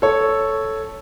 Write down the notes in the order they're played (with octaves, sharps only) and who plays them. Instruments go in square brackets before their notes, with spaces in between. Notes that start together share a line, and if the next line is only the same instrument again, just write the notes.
[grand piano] A4 C#5